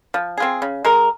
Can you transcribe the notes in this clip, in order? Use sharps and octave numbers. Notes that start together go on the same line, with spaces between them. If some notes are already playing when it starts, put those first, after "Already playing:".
F3
C4 F4 G#4
C#3
G#3 D#4 A#4